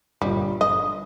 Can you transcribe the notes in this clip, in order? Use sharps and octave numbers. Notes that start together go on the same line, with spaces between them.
G1 A#2 G3 D#5
G2 D#5